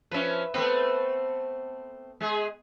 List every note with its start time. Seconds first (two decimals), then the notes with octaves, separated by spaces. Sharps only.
0.11 F3 C#4 B4 E5
0.54 A3 B3 C4 B4
2.20 G#3 G#4